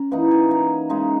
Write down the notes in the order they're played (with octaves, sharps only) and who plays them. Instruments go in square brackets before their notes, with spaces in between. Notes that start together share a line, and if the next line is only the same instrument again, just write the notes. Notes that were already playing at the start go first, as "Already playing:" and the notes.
Already playing: [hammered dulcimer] C#4 A#5
E3 A#3 D#4 F#5
G#5
A#5
C#3 G#3 D#4 A#5